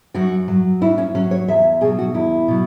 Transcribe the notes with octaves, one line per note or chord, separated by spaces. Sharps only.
F#2 F#4
F#3
F#2 E4
C#4
F#3 C#4
C#5
E2 E5
B2 F#3 G#4
F#4
E2 E4
B2 F#3